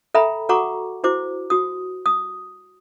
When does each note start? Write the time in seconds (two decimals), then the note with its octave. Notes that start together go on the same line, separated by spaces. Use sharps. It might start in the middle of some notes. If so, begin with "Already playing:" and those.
0.14 A4 E5 G5 A#5 B5
0.49 F#4 A4 F#5 A#5 C#6 D6
1.04 E4 F#4 C5 D6
1.50 F#4 D#6
2.06 D#6